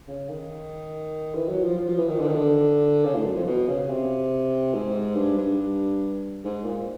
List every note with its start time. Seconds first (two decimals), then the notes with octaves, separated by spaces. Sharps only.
0.08 C#3
0.30 D#3
1.35 E3
1.49 F#3
1.64 F3
1.78 F3
1.88 F3
1.98 E3
2.09 D#3
2.20 D3
2.27 D#3
2.35 D3
3.05 C#3
3.15 A2
3.25 F#2
3.36 F2
3.47 B2
3.68 C#3
3.90 C3
4.74 G#2
5.16 G2
5.38 G2
6.44 G#2
6.64 A#2